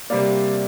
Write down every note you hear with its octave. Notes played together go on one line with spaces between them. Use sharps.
C3 G3 A#3 D5